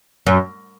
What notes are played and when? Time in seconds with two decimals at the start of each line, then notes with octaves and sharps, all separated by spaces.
0.27 F#2